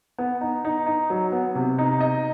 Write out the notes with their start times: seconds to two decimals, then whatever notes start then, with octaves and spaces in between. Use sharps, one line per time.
0.18 B3
0.41 D#4
0.65 D#4
0.86 D#4
1.10 F#3
1.32 B3
1.55 C3
1.78 D#4
2.01 D#5